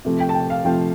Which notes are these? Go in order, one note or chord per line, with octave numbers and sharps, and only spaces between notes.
C3 F3 A3
G5
A5
G5
F5
C3 F3 A3 G5